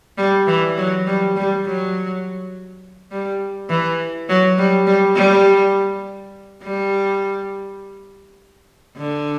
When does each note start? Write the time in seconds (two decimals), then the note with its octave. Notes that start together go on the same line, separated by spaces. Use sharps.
0.18 G3
0.47 E3
0.77 F#3
1.07 G3
1.36 G3
1.65 F#3
3.11 G3
3.69 E3
4.29 F#3
4.58 G3
4.87 G3
5.16 G3
6.63 G3
8.97 D3